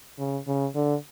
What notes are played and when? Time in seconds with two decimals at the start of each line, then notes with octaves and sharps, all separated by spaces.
0.19 C#3
0.47 C#3
0.75 D3